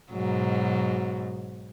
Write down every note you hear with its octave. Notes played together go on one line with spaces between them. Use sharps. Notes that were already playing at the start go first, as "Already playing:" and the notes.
G#2 B2 F#3